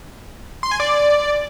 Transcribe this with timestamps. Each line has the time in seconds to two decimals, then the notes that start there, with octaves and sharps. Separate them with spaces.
0.63 C6
0.71 G#5
0.80 D5